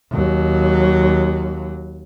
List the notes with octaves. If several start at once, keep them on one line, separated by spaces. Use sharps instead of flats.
D#2 F#3